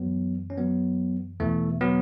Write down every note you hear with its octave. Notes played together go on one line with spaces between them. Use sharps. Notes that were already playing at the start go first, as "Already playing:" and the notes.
Already playing: F#2 E3 F#3 B3
C#4
F#3 B3
E2 B2 E3 A3
F#3 B3